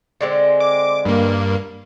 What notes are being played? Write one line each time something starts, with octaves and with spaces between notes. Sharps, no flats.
D3 G#3 C4
D6
G2 A#3